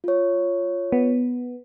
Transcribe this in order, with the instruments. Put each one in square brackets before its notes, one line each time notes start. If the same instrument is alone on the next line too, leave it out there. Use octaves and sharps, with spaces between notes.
[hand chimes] F4 C#5
[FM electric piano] B3